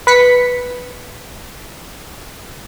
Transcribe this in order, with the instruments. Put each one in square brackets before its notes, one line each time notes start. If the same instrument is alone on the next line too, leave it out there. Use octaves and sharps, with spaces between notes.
[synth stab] B4 B6 C#7